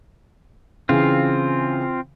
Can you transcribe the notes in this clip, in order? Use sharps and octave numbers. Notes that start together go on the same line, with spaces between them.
C#3 E3 C4 F4